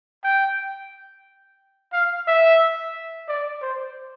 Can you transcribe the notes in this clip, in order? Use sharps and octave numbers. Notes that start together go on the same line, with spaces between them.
G5
F5
E5
D5
C5